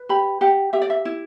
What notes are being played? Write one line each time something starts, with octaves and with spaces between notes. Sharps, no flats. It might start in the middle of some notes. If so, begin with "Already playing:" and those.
Already playing: B4
G4 B5
G4 F#5
G4 E5
D5
E5
E4